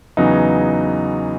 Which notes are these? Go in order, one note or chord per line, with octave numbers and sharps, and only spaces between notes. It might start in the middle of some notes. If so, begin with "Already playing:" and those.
E2 C#3 F#3 B3 D#4